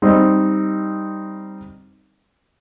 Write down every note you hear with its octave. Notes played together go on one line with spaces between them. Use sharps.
G3 C4 D#4